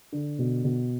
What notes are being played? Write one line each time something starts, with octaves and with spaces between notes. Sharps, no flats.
D3
B2
B2